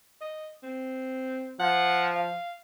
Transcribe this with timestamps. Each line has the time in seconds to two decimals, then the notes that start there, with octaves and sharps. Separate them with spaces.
0.21 D#5
0.63 C4
1.59 F3 F#5
2.16 F5